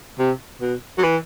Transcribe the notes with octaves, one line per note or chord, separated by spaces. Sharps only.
C3
B2
F#3
E3